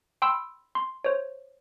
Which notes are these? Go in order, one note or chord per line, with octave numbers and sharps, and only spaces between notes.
G5 B5 C6 E6
C6
C5 C#5